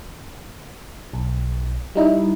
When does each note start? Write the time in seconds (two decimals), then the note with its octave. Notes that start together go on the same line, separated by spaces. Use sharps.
1.13 B1
1.95 G3 D#4 E4